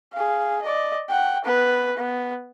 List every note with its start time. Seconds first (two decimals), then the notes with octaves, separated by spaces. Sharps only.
0.13 G#4 F5
0.62 D5 D#5
1.09 F#5 G5
1.44 B3 B4
1.97 B3